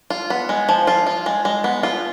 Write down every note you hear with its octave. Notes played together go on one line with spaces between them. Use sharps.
F4
B3
G#3
F3
F4
F4
G#3
G#3
B3
F4